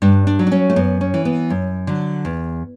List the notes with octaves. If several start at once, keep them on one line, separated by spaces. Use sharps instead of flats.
G2 D4
D4
F#3
D4
C#4
A3
F#2 B3
C#4
E3
B3
F#2
D3 F#3
E2